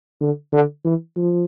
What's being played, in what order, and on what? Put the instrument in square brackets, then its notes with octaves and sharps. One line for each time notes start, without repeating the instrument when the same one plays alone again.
[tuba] D3
D3
E3
F3